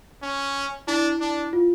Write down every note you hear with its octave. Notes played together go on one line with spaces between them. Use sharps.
C#4
D4 E4
D4
F4